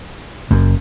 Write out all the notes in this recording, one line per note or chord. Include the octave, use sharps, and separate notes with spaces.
F#1 F#2